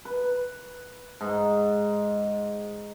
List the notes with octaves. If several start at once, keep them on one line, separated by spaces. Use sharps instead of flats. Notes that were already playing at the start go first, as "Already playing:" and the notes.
B4
G#2